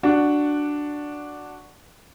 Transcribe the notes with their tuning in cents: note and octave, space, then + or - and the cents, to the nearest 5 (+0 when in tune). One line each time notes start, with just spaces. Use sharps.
D4 +0 F#4 +0 F#5 +0